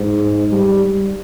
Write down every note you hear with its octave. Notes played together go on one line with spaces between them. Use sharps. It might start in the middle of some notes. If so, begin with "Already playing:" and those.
Already playing: G#2
G3